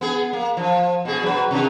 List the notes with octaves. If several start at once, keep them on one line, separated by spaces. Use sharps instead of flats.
B3 G#4
A#3
F3
B2 G#4
F#3 B4
C3 D#3